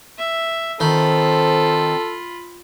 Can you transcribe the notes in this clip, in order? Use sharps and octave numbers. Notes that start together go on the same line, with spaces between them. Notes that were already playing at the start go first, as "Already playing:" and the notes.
E5
D#3 C4 F4 A4 B5